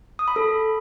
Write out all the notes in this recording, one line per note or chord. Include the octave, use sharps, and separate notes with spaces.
D#6
B5
A4